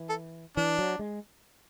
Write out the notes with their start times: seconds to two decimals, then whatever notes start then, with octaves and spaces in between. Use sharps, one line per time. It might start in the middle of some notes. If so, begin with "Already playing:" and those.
Already playing: E3
0.09 A4
0.57 E3 D4
0.79 F#3
0.99 G#3